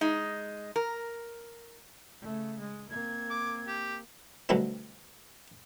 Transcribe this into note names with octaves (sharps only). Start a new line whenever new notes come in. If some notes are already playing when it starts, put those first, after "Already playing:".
G#3 D#4
A#4
C#3 A3
G#3
A#3 C4 G#6
D6
G4
B2 D3 F#3 G3 A3 C4